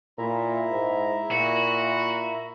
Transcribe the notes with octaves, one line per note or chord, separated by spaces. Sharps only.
A#2 E4 E5 A#5
G#2
A#2 F#4